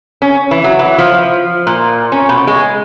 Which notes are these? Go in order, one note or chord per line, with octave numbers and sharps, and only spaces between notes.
C#4
E3
F#3
E3
F3
A#2
C#4
B2
G#3